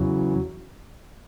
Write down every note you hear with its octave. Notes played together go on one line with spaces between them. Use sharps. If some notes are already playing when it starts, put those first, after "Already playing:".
Already playing: E2 C#3 E3 F#3